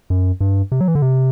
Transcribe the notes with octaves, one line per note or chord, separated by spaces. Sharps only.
F#2
G2
C3
F#3
E3
D3
C3